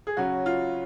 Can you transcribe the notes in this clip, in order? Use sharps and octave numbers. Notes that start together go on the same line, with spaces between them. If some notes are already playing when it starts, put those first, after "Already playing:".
G#4
C#3 F#3 C#4 F#4
F4